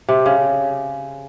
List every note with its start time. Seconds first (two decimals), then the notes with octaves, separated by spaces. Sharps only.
0.09 C3
0.26 C#3